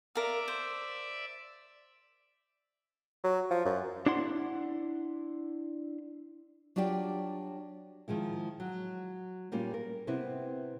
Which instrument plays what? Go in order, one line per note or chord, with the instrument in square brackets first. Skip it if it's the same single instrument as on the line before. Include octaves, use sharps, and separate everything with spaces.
[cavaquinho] A#4 F5 [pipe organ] D5 E5
[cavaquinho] C5
[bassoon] F#3
F3
F#2
[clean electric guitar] D4 E4 F#5 C6
[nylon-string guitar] F#3 D4 F4 G4 D5
D#3 F3 G#3 E4
F#3
A#2 G3 A#3 C#4 F4
A#4
C3 B3 C4 E4